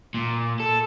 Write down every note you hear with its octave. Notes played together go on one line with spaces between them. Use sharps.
A#2
A4